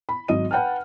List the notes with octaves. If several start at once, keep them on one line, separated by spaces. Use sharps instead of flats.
B5
G#1 F#3 D#5 D#7
B4 F#5 G5 A5 F6